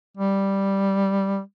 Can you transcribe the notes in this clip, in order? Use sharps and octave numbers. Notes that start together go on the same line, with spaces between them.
G3